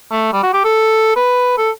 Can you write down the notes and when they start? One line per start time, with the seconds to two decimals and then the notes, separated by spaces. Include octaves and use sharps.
0.11 A3
0.33 G3
0.43 F#4
0.53 G4
0.64 A4
1.16 B4
1.58 A4